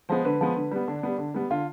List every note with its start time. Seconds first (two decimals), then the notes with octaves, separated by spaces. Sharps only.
0.09 F3 G#3 B3 C5
0.25 D3 B4
0.41 F3 G#3 B3
0.56 D3
0.72 G3 B3
0.88 D3 D4
1.03 G3 B3
1.18 D3
1.35 G3 B3
1.50 D3 F4